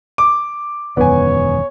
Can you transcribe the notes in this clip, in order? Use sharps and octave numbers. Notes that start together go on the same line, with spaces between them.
D6
E1 F#2 D#3 B3 C#5 G#5